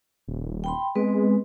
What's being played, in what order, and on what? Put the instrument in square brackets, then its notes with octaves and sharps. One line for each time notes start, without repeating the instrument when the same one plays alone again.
[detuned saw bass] D#1
[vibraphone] G5 B5 C6
[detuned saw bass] G#3 [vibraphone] B3 C4 B4